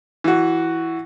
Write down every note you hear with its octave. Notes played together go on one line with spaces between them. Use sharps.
E3 F#4